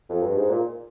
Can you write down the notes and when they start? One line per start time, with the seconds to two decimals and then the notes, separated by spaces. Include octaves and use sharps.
0.09 F2
0.23 G2
0.36 G#2
0.50 A#2